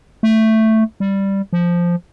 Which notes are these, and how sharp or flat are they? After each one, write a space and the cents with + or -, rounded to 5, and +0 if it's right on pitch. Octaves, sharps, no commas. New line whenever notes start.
A3 +5
G3 +0
F3 -5